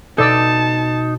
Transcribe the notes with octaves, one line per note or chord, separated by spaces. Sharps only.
B2 D#4 A4 D5 A5 E6